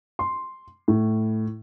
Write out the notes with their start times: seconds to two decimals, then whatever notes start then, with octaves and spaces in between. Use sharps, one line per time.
0.19 C6
0.88 A2